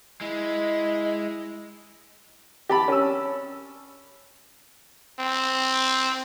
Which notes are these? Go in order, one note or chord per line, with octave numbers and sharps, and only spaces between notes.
G#3 E4 D#5
G4 A5 B5
C#4 E6
C4